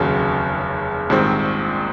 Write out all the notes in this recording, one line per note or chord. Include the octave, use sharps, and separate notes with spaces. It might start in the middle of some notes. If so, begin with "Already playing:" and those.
Already playing: F1 D#2 C#3 F#3
A#1 G#2 D#3 G3 C4